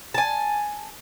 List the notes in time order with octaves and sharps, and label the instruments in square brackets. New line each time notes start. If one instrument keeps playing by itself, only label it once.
[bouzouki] G#5 A5